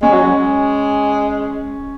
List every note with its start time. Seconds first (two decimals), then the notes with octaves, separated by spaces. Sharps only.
0.02 G#3 C#4
0.13 F#3
0.24 G#3